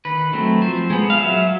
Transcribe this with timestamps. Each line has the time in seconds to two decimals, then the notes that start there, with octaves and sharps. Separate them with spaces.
0.05 D#3 B4
0.33 F#3 A3 C4
0.62 F3 C5
0.90 G#3 B3
1.10 F5
1.18 F#3 E5